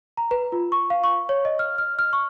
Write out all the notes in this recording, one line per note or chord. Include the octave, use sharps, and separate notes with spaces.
A#5
B4
F4
C#6
F5
C#6
C#5
D#5
F6
F6
F6
C#6